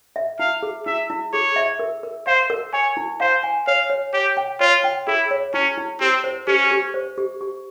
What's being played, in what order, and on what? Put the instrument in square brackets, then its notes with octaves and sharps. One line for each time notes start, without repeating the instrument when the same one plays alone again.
[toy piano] E5
[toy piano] E4 [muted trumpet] F5
[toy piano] G#4
[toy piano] E4 [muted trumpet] E5
[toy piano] E4
[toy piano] G#4 [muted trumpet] C#5
[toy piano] E5
A#4
A#4
[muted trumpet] C5 [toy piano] F5
[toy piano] A#4
[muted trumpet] C#5 [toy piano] G#5
[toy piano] E4
[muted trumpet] C5 [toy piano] F5
[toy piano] G#5
[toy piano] C#5 [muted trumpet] F5
[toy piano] C#5
[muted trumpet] G4 [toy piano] C#5
[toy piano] G5
[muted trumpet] F4 [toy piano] C#5
[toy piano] G5
[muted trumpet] E4 [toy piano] G#4
[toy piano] C#5
[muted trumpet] C#4 [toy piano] E4
[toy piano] E4
[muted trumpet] C4 [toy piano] G4
[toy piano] C5
[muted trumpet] C#4 [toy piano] G4
[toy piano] G4
C5
G4
G4